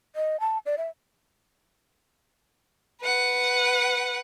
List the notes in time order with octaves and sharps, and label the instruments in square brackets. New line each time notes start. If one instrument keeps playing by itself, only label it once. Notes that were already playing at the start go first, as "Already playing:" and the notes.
[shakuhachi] D#5
A5
D5
E5
[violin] B4 F#5